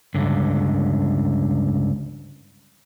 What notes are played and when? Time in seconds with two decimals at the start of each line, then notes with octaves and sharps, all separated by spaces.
0.14 C#2 G2 D3